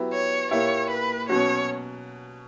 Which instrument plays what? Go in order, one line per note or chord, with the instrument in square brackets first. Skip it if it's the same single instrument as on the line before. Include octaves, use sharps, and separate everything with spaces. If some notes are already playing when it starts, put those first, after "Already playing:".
Already playing: [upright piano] F#3 B3 E4 G4
[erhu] C#5
[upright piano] A#2 A#3 E4 G4 [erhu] C#5
[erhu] B4
[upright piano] B2 F#3 C#4 F#4 [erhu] C#5